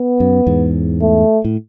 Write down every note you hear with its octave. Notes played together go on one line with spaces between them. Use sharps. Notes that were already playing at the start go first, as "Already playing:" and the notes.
Already playing: B3
F#2
E2 G#2
A3
A2